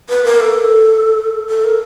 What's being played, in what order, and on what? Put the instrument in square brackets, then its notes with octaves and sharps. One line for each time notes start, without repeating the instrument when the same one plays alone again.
[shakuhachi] B4
A#4
A4
A4
A#4